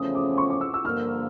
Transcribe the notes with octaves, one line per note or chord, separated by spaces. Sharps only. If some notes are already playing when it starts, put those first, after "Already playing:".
Already playing: E2 C#3 F3 A3 C#4 D#6
D6
C#6
D6
E6
E6
G2 D3 F3 A#3 F6